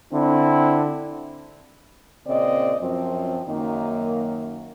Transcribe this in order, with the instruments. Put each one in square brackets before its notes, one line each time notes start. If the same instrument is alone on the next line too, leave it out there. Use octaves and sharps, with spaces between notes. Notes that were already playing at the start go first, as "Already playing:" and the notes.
[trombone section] D3 C4 D4 E4
[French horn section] A#2 C#3 C4 D5 D#5
F#2 F3 C4
F#2 D#3 A#3